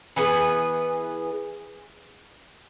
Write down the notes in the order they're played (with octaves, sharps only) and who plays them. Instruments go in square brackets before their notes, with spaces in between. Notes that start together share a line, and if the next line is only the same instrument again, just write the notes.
[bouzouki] E3 B3 G#4 B4